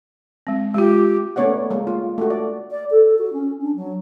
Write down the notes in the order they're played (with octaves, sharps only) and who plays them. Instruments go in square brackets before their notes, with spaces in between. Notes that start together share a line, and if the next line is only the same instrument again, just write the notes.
[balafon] G#3 C4
[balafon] G#3 F4 [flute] G4
[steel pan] A3 B3 C#4 C#5 D5 F#5
G#3 A#3
F4
A3 F#4
D5
[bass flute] D5
A4
F#4
C#4
D4
F#3